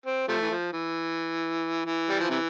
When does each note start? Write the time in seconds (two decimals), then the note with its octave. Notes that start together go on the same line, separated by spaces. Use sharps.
0.06 C4
0.28 C3 F3 A3
0.41 E3
0.50 F3
0.73 E3
1.85 E3
2.10 G3
2.20 F3
2.30 C3 E3